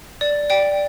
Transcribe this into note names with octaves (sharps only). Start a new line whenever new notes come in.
D5
D5 G5